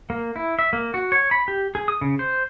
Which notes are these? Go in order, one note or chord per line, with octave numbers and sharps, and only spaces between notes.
A#3
E4
E5
A#3
F#4
C#5
B5
G4
G#4
D#6
C#3
C5